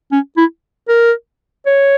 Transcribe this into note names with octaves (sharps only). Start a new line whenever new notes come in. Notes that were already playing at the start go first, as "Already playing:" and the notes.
C#4
E4
A#4
C#5